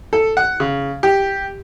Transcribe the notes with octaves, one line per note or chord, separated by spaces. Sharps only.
A4
F#5
C#3
G4